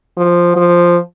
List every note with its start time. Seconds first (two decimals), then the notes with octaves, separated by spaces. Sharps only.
0.17 F3
0.56 F3